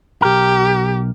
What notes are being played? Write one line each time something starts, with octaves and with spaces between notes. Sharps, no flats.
B1 G4 A#4